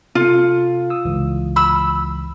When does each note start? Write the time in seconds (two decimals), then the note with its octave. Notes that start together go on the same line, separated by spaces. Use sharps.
0.15 C3 F4 A4 C#7
0.90 D#6 E6
1.05 G1 C#2 E3
1.56 B5 E6